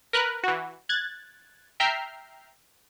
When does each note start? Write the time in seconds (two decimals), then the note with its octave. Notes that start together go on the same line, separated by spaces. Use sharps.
0.13 A#4 B4 F#6
0.43 E3 F#4
0.89 F#6 G#6 A6
1.80 E5 G5 A#5 F6 G6 C7